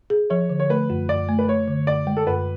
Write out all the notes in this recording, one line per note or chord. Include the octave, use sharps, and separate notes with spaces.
G#4
F3 C#5
D3
C#5
A3 B4
F#2
F#2 D5
A3
B4
A3 C#5
D3
F#2 D5
G#3
A4
F#2 B4